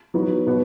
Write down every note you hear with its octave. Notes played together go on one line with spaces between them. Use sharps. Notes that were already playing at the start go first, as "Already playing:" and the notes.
F#3 B3 D#4 F#4
B2 B3 F#4